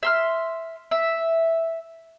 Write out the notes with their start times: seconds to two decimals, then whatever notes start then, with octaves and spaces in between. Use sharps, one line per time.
0.03 E5 C6 F6
0.91 E5